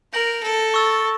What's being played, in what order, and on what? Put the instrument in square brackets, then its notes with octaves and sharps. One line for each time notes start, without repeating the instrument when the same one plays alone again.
[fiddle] A#4 [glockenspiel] G6 A#6 D7 F#7
[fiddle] A4
[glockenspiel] C#6 E6 A6